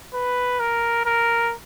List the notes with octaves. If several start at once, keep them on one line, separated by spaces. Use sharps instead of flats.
B4
A#4
A#4